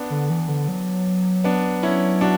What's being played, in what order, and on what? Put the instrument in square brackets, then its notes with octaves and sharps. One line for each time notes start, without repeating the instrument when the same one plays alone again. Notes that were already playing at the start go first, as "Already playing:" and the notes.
Already playing: [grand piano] B3 D4
[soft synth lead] D3
E3
D3
F#3
[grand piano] B3 D4
C#4 E4
D4 F#4